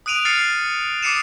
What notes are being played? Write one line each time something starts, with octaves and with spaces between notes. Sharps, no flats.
D#6 F#6 D7 D#7 F7
F6 A6 C7 C#7 D#7
D6 D#6 C7 C#7 D#7 E7